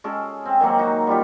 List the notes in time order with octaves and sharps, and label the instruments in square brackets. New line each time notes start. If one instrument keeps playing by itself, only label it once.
[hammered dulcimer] G#3 C#4 G#4 A4
C4
D#3 F#3 A#3 C4
D#4 F#4
G3 F4 G4